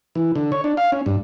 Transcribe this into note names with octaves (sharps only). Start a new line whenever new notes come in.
E3
D3
C#5
D4
F5
C#4
G2